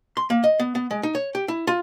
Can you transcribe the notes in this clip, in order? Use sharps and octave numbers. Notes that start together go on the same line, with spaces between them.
C6
A#3
D#5
B3
B3
G#3
D#4
C#5
G4
E4
F4